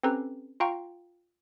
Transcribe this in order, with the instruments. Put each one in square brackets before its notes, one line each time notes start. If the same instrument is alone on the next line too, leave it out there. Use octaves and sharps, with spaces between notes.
[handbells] C4 C#4 G4 A4 B4 A#5
F4 F5 G5 A#5 C#6